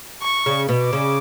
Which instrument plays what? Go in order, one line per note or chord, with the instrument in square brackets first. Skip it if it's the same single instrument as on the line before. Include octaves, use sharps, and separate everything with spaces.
[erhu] C#6
[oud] C#3
B2
[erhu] D6
[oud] C#3